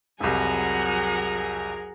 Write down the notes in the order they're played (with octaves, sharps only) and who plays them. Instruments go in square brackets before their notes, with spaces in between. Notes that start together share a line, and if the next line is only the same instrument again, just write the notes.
[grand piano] C2 F2 [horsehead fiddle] F#3 F#5 [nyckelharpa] G#4 A#4 [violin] G#5 A#5